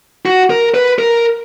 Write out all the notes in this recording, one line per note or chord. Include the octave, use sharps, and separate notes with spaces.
F#4
A#4
B4
A#4